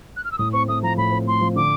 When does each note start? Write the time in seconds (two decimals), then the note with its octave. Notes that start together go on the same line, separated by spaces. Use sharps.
0.16 F#6
0.24 F6
0.32 E6
0.38 A2 D#6
0.53 C4 C#6
0.68 A3 D#6
0.83 F3 A#5
0.97 A2 B5
1.12 C4
1.27 A3 C6
1.41 F3
1.56 D3 D6